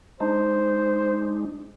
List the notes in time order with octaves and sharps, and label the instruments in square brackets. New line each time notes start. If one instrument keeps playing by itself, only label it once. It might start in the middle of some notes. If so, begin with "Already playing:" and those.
[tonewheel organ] G#3 D4 D#4 [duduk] C5